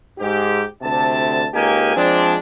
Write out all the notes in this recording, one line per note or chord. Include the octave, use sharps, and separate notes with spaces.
G#2 G4
D2 C3 A5
C#2 A#3 D#4 G4 G#5
F3 G#3 C4 D4